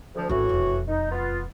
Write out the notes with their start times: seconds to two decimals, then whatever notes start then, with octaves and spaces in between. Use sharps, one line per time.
0.15 D2 F3
0.29 G#1 A2 E3 C#4 F#4
0.49 E1 F2
0.87 D#4
1.10 B3 F4